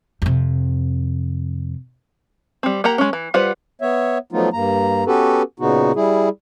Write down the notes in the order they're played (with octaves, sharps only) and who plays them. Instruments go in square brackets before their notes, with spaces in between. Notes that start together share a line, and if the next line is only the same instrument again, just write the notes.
[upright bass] F2 C3
[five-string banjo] G3 C4
A#3 G4 F#5 A#5
G#3 C#4
E3
G3 F4 B4 C5 F#5
[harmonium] B3 C#5 E5
F3 F#3 A3 B3 D#4 F4
G2 A#3 A#5
B3 C#4 F#4 G4 A4 B4
A#2 C#3 B3 D#4 F#4
G3 E4 G#4